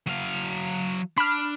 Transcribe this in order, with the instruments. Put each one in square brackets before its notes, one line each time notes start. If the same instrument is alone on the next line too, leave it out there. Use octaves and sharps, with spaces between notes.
[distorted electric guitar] F#3 F5
[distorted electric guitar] D4 [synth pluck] B5 F6